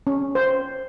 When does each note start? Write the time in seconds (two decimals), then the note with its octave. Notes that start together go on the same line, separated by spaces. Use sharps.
0.07 C#4
0.35 C5